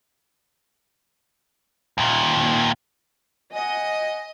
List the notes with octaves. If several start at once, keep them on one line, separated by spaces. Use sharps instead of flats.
D#2 A#2
D#5 F#5 G#5